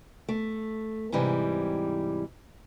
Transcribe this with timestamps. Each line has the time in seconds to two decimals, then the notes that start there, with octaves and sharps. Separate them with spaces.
0.29 A3
1.12 G#2 C3 E3 G3